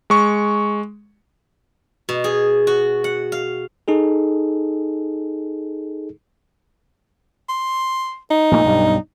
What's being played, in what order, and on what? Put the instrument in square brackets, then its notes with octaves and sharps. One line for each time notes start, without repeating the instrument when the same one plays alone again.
[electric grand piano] G#3 C#6
[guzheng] B2
G#4
F#4
F#5
F5
[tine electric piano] D#4 G#4 A4
[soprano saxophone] C6
D#4
[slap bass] A#1 A#2 A3
B1 G2 G3